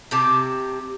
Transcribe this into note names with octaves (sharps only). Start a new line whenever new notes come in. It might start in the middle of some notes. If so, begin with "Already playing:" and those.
C3 G4 A5